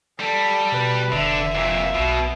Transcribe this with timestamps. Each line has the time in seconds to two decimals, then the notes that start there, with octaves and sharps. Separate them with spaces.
0.19 G3 A4
0.72 B2 B4
1.12 F1 D3 E5
1.55 F2 A#2
1.94 B1 B2